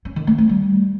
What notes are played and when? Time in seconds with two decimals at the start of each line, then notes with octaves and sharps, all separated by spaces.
0.05 C#4
0.16 D#3
0.27 A3
0.38 C4
0.49 G3